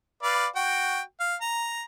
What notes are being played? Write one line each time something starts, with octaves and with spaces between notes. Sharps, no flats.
B4 D5 F5
F#4 G5
F5
A#5